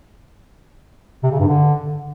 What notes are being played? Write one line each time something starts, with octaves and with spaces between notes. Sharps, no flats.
C3
C#3
G2
D3